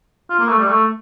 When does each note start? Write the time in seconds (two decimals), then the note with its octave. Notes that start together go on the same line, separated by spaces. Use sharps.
0.30 F4
0.39 A#3
0.49 A3
0.58 G3
0.68 A3